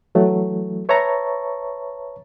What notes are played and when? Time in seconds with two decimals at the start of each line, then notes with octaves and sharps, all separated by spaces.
0.15 E3 F#3 A3
0.89 B4 C#5 E5 A5 A#5 C#6